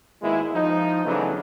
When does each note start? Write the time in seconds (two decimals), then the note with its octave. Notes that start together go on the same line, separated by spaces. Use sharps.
0.22 G#1 G#3 A#3 B3 E4
0.53 F3 D#4
1.05 C#3 E3 F#3 A3 B3 D4